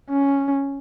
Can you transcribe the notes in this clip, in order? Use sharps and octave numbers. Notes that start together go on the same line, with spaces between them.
C#4